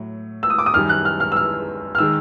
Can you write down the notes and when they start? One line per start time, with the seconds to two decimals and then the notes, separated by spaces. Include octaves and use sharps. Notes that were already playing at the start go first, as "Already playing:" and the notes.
Already playing: A2 F#3
0.43 E6
0.50 D#6
0.59 D6
0.66 D#6
0.74 F#2 D#3 G3 F6
0.89 F#6
1.05 F6
1.20 F6
1.32 E6
1.36 F6
1.95 F6
1.98 D#3 G#3 E6